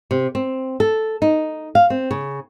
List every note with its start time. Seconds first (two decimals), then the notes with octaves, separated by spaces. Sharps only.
0.11 C3
0.35 C4
0.80 A4
1.22 D#4
1.75 F5
1.90 C4
2.11 C#3